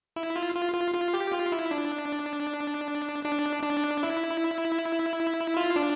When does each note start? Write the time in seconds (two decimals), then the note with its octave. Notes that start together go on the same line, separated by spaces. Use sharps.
0.16 E4
0.36 F4
0.55 F4
0.74 F4
0.94 F4
1.14 G4
1.32 F4
1.52 E4
1.71 D4
3.25 D4
3.63 D4
4.03 E4
5.57 F4
5.76 D4